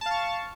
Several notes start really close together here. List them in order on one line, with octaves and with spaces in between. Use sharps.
A5 F5 C#6